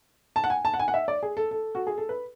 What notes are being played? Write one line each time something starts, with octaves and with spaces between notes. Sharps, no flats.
A5
F#5
G#5
A5
F#5
G#5
F#5
E5
D5
G#4
A4
A4
F#4
G#4
A4
B4